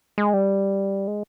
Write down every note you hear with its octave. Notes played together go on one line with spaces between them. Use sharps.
G#3
G3
G#3